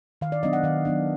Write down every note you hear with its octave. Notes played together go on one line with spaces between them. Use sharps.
D#3 F5
D5
F#3 B3 D4 D#5
F#5
D#3 F5
F#3 B3 D4